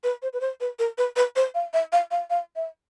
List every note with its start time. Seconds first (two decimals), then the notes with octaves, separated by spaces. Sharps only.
0.04 B4
0.22 C5
0.33 B4
0.41 C5
0.61 B4
0.79 A#4
0.98 B4
1.16 B4
1.36 C5
1.55 F5
1.73 E5
1.92 F5
2.11 F5
2.30 F5
2.56 E5